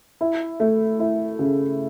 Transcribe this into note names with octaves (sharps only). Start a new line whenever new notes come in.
E4
A3
E4
C#3